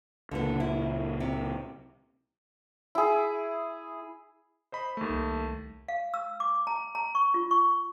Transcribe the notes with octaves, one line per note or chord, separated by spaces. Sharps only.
C#2 A#2 D3 B3
E4
C3
E4 G#4
C5 D#5 B5
D#2 A3
C2
F5
E6
D6
A#5
A#5
C#6
F4
C#6